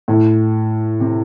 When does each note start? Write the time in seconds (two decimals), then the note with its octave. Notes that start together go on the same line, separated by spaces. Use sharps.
0.08 A2
1.00 C3